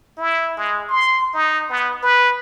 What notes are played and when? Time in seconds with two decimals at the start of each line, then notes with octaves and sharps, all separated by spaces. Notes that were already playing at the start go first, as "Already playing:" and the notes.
0.18 E4
0.57 G#3
0.89 C6
1.34 D#4
1.70 B3
2.03 B4